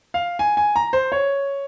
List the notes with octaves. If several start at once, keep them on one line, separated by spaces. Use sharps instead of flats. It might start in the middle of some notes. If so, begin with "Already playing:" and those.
F5
G#5
G#5
A#5
C5
C#5